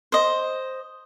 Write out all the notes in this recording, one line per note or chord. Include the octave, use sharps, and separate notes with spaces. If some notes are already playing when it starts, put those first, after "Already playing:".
C5 D#5